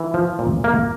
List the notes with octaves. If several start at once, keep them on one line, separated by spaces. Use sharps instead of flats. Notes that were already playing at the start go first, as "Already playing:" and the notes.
Already playing: E3
F3
A#2
A#3